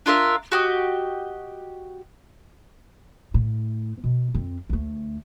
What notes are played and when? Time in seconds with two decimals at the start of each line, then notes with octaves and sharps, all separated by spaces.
0.06 D4 F4 A#4 E5
0.52 F#4 G4 D#5
3.34 A2
4.04 B2
4.34 F2 C4
4.69 D2 A3